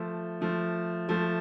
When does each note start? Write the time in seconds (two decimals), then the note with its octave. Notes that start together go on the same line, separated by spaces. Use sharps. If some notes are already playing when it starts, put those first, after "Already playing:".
Already playing: F3 A3
0.41 F3 A3
1.09 F3 A3